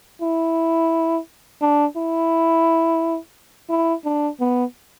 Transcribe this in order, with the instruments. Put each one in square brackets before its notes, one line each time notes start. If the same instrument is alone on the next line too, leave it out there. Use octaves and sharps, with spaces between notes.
[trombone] E4
D4
E4
E4
D4
B3